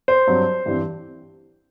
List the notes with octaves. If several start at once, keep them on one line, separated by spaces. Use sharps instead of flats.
C5
G2 F#3 C4
G2 E3 G3 C4